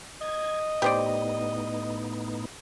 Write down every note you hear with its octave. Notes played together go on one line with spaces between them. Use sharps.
D#5 G#6
A2 B3 D#4 G4 C5 D5